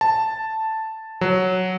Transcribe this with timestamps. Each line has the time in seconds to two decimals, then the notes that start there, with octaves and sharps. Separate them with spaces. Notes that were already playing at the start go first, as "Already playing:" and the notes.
0.01 A5
1.21 F#3